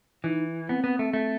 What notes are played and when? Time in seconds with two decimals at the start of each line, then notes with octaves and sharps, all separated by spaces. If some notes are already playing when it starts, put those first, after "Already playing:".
0.24 E3 D#4
0.69 B3 C4
0.84 B3
0.99 A3
1.13 A3